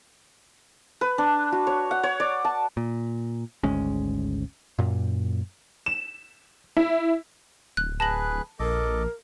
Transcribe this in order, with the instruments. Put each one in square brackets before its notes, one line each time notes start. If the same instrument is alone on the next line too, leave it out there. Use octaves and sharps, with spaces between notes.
[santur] B4
D4
F#4
C#5
F#5
C#5
D5
A5
[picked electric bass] A#2
G#1 D2 G#3 C#4
F#2 A#2
[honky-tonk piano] E7
E4
[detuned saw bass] D1 [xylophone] F#6
[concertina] G#4 B4 F#6 [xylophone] A5 A#6 F#7
[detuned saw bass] A#1 [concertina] A4 D#5 D6 [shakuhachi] A#4